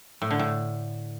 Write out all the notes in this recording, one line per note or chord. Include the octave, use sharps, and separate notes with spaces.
A2
D3
A2